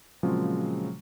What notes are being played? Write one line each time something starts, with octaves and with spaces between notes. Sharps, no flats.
A#2 C#3 F3 F#3 G#3 C4